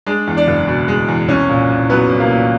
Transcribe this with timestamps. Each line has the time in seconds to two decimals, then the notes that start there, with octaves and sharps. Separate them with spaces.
0.06 G#3 D4 D5
0.27 E2
0.37 D4 D5
0.48 F#1
0.67 B2
0.88 G#3
1.08 E2
1.28 C2 C#4 C#5
1.49 A#2
1.69 C2
1.90 F#3 B3 B4
2.09 C2
2.20 A#3 A#4
2.30 A#2